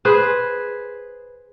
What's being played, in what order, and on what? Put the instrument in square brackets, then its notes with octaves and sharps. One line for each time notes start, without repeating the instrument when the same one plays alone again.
[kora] G#4 B4 C5